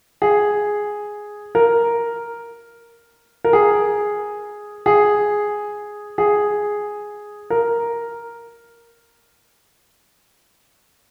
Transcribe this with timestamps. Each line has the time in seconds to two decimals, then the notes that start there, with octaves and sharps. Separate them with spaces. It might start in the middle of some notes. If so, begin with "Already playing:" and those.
0.22 G#4
1.55 A#4
3.44 A#4
3.53 G#4
4.86 G#4
6.18 G#4
7.50 A#4